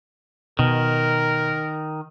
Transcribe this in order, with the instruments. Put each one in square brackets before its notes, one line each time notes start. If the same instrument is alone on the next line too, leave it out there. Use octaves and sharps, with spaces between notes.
[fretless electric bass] B2 [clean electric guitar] D#3 [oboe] A#4